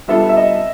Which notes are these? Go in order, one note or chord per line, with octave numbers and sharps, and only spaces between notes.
G3 B3 D4 F4 A4 E5
E5
D#5